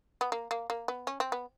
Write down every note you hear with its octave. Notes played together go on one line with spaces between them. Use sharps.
B3
A#3
A#3
A#3
B3
C#4
C4
B3